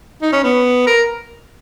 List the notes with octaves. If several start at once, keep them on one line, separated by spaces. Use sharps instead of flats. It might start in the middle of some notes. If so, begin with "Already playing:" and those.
D#4
C#4
B3
A#4